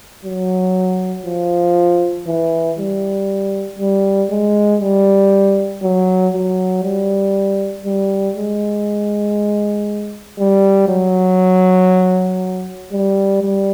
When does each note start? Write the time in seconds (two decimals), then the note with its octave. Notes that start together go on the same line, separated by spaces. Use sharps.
0.25 F#3
1.26 F3
2.27 E3
2.78 G3
3.79 G3
4.30 G#3
4.81 G3
5.83 F#3
6.33 F#3
6.84 G3
7.85 G3
8.36 G#3
10.39 G3
10.89 F#3
12.92 G3
13.42 G3